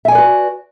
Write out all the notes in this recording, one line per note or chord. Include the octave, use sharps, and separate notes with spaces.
F#4 B4 D5 E5 G#5